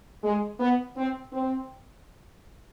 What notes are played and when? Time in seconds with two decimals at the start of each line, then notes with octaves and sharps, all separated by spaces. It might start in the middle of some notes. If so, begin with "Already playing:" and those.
0.24 G#3
0.60 B3
0.97 C4
1.33 C4